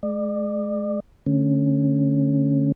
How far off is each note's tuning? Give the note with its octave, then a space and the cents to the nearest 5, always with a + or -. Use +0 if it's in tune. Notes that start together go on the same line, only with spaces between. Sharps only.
G#3 +35 D5 +35
D3 +0 A3 +0 C#4 -10